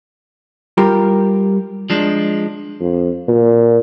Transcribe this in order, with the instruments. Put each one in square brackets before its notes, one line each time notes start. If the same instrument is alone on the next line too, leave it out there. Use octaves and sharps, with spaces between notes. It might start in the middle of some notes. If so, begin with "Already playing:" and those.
[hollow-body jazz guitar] G3 F4 G4 A#4
[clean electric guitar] F3 G#3 D4
[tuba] F2
A#2